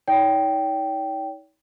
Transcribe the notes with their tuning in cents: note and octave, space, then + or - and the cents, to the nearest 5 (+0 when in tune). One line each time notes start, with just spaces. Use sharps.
D#4 +40 C#5 +40 G5 -10